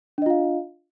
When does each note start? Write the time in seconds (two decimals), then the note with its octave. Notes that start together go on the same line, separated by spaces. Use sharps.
0.18 D4
0.22 D#5
0.26 F4
0.30 F5